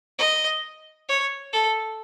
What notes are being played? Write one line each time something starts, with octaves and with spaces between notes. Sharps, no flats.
D#5
C#5
A4